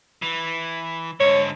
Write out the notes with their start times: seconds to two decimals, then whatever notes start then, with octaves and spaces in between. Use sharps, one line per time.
0.22 E3
1.20 G#2 D3 C#5